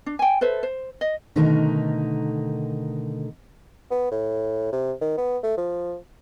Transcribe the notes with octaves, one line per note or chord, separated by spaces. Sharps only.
D4
G5 G#5
A4 B4 C5 E5
C5
D#5
B2 D3 D#3 A3 D#4 A#4
B3
A2
C3
D#3
B3
A3
F3